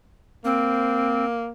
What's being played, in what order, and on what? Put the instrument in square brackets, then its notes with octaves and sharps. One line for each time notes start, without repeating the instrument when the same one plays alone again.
[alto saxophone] A#3 [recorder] C4